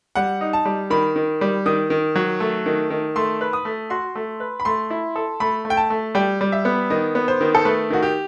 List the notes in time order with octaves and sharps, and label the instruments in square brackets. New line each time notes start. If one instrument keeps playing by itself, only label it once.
[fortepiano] G3 [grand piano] F#5
[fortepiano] D#4
[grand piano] A5
[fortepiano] G3
[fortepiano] D#3 [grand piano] B5
[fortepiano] D#3
G3
[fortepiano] D#3 [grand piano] D#6
[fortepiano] D#3
F#3
A3
D#3
D#3
[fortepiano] A3 [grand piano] C6
[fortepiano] B4
[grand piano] D#6
[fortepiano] A3
[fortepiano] F#4 [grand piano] C6
[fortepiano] A3
B4
[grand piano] B5
[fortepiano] A3 [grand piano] C6
[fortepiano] E4
A4
[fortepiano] A3 [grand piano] B5
[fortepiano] A3
[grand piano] G5
A5
[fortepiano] A3
[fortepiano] G3 [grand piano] G5
[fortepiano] G3
[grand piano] E5
[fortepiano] B3
[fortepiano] D#3 [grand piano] D#5
[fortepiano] B3
[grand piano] C5
[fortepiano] D#3
[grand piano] A4
[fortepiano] A3 [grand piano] B4
[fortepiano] D#3 [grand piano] F#4
[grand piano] G4